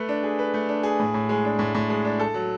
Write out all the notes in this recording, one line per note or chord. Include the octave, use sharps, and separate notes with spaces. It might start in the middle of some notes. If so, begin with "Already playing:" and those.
Already playing: A3 B4
D4
G#4
B4
A3
D4
G#4
A2
A2
G#3
D4
A2
A2
G#3
D4
A4
F#3